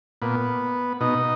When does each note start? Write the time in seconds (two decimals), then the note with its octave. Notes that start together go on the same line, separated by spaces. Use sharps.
0.22 A#2 B3
1.01 B2 D#4